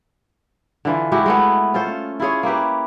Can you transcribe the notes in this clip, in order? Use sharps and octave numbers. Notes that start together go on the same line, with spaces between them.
D3 E3 F4
G#3 E4 F#4 G4
G#3 A3 B3
C#4 F4 A4 C5
E4 F4 G#4 C#5
A#3 E4 G4 B4